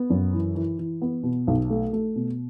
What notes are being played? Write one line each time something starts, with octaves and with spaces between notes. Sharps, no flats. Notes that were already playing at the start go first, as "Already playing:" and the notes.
Already playing: B3
F#2
E3
E3
E3
B3
B2
B1
A3
A3
B2